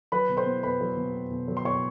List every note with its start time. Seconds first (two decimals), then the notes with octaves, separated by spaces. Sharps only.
0.12 F#3 B4 B5
0.29 B2
0.37 C5 C6
0.46 B3
0.63 B2 B4 B5
0.81 F#3
0.97 B2
1.14 B3
1.31 B2
1.48 F#3
1.57 C6
1.65 B2 C#5 C#6